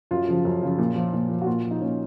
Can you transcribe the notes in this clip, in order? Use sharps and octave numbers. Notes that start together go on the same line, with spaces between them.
F#2 F4
C#3 F3
F#2
C#3 F3
A#2
F3
A#2
F3
F#4
A#2 F4
F3
D#4
A#2 C#4